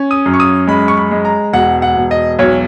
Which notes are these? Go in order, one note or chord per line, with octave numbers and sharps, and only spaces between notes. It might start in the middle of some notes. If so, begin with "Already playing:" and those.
Already playing: C#4
D#6
F#2
C#6
D#6
G#3 B5
C#6
B5
G#3
A#5
E1 F#5
F#5
E1
D#5
B1 C#5